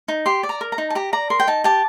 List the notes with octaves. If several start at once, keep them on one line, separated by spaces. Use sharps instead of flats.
D#4
G4 C6
D5
A#5
A#4
A#5
D#4
A5
G4 A#5
D5 A#5
A#4 C6
G5
D#4 A5
G4 A5